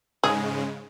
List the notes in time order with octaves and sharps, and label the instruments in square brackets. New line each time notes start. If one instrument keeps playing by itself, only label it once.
[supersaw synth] G#2 C#3 G#3 [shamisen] G#4